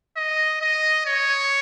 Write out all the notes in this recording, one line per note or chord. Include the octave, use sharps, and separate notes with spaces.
D#5
D#5
C#5